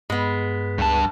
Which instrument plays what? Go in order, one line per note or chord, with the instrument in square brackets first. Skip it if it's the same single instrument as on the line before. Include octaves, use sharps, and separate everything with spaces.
[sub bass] G2 [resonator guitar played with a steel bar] G#3 B3
[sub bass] C#2 [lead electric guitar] G2 A5